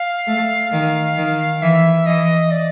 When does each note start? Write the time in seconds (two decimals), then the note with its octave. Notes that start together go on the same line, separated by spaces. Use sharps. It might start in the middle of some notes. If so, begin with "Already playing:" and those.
Already playing: F5
0.27 A3
0.72 D#3
1.17 D#3
1.62 E3 E5
2.06 E3 D#5
2.51 D5